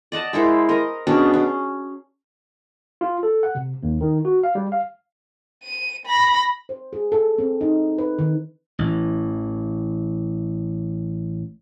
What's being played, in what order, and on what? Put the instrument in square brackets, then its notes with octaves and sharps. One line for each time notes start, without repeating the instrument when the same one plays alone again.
[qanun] D5 D#5 F#5 A5
G#3 E4 A#4 C5
A#4 D#5
B2 C#4 D4 G#4
C#4
[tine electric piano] F4
A4
F#5
C3
D#2
D#3
F#4
F5
G3
F5
[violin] D#7
B5 A#6
[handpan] C5
G#4
A4
C4
D#4
B4
D#3
[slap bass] A1 E3